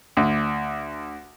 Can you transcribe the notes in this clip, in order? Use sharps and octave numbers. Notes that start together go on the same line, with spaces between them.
D2